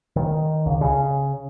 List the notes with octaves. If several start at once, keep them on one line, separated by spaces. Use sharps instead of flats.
D#3
C#2
C#3